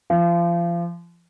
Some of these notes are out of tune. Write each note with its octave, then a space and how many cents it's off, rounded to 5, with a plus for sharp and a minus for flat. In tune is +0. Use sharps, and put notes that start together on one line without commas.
F3 -30